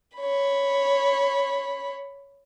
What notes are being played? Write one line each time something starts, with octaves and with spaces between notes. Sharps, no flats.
C#5 B5